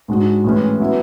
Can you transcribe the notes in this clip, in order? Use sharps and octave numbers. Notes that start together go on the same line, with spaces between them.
G#2 G#3 D4 F#4
A2 E3 G#3 C#4
F#3 B3 E4